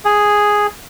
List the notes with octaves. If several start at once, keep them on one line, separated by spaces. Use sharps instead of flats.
G#4